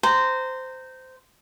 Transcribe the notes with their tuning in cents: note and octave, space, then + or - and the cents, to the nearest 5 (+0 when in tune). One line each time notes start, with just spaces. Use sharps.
C5 -15 A#5 -15